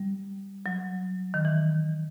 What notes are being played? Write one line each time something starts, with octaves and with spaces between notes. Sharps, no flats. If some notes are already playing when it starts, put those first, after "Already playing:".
Already playing: G3
F#3
D#3
E3